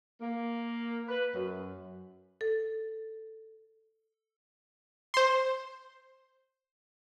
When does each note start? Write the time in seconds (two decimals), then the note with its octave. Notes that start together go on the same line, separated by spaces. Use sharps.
0.21 A#3
1.08 B4
1.35 F#2
2.41 A4
5.14 C5 C6